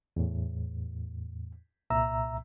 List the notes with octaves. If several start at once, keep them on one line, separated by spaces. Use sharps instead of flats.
E2 A2
C2 A#2 E5 A#5 E6